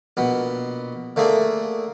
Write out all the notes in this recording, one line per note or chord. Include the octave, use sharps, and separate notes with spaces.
A#1 B2 B3
D3 A3 A#3 G#4